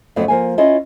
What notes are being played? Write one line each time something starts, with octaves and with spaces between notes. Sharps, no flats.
F2 C#3 F#3 A3 B3 D5
F3 A#3 G#5
C#4 E4 F4 D#5